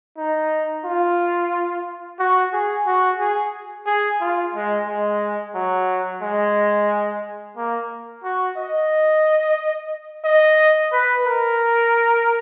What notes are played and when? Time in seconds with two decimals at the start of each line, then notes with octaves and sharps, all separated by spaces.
0.17 D#4
0.85 F4
2.19 F#4
2.53 G#4
2.86 F#4
3.19 G#4
3.86 G#4
4.21 F4
4.55 G#3
4.88 G#3
5.55 F#3
6.22 G#3
7.57 A#3
8.24 F#4
8.58 D#5
10.25 D#5
10.93 B4
11.26 A#4